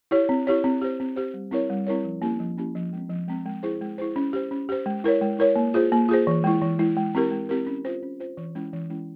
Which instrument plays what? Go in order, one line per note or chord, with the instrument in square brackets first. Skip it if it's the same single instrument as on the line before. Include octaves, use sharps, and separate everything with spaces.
[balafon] E4 G4 C#5
C4
E4 G4 C#5
C4
G4 C5
C4
G4 C5
G3
C4 E4 A#4 C#5
G3
C4 E4 A#4 C#5
F3
A#3 C#4 E4 G4
F3
A#3 C#4 E4 G4
F3
G#3 C4
F3
G#3 C4
G#3
E4 G#4 C5
G#3
E4 G#4 C5
C#4
G4 C5
C#4
G4 C5
G#3
E4 A#4 C#5
G#3
E4 A#4 C#5
A#3
F4 G#4 C5
A#3
F4 G#4 C5
E3
G#3 E4
E3
G#3 E4
G#3
C4 E4 G4 A#4
G#3
C4 E4 G4 A#4
C#4
F4 C5
C#4
F4 C5
E3
G#3 C#4 E4
E3
G#3 C#4 E4